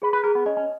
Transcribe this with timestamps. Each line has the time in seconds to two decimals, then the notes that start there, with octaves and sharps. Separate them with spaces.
0.02 G#4 B4
0.13 B4
0.24 G#4 A#4
0.35 B3
0.46 C#4 D#5
0.57 C#4